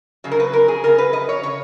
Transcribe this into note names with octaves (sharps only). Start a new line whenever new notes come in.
F2 C#3 F#3
A#4
B4
A#4
G#4
F2 C#3 F#3 A#4
B4
D#5
C#5
C#3 C#5